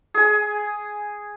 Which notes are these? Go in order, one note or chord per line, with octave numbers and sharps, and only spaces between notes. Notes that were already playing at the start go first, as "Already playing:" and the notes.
G#4 G#5